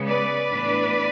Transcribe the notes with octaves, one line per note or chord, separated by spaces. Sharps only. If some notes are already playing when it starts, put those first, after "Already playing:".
Already playing: C#3 G#3 B3
B4 D5
A2 E3 B3 D4